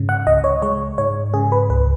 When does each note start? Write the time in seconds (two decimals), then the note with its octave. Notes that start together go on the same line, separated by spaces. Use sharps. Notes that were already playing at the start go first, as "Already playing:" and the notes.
Already playing: G#2 C#3
0.09 F#5
0.27 C#2 D#5
0.44 C#5
0.62 G#3 C#5
0.98 G#2 C#5
1.34 C#3 G#4
1.52 B4
1.70 C#2 B4